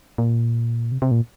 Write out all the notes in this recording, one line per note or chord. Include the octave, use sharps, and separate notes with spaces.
A#2
C3
C3
A#2